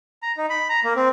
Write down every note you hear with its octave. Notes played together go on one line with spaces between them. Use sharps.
A#5
D#4
B5
A#5
A#3
C4